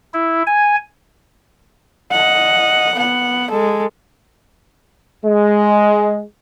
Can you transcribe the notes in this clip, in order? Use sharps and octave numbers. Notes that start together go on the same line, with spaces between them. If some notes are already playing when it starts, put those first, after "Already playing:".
E4
G#5
D#5 F#5
B3 F#5
G#3 A4
G#3